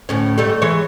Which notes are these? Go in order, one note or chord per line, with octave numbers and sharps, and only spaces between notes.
D2 A2 C#4
G#2 G3 A3
E3 G#3 C#5